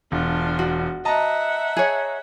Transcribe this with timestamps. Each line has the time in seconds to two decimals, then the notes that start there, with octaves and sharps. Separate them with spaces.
0.12 E1 D4 F4
0.59 F#4
1.05 D#5 E5 F#5 A5 A#5
1.77 G#4 C#5